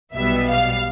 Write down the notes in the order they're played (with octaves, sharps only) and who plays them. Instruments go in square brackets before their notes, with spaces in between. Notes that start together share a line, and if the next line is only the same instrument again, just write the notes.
[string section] B1 B2 G3 B3 E5
F5